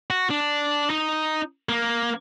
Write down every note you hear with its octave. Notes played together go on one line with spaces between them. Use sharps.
F#4
D4
D#4
A#3